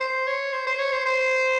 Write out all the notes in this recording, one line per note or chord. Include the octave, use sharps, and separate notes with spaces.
C5
C#5
C5
C5
C#5
C5
C5